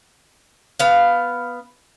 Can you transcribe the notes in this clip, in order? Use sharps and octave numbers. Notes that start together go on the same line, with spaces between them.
B3 F5